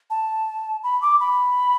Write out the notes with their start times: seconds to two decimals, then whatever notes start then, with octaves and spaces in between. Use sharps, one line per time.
0.10 A5
0.84 B5
1.02 D6
1.20 B5